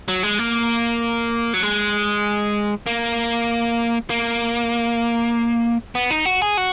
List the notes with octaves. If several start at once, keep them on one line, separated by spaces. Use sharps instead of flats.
F#3
G#3
A#3
F#3
G#3
A#3
A#3
B3
D#4
F#4
G#4
F#4